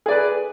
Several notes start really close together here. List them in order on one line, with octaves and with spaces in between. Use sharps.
G#4 D5 B4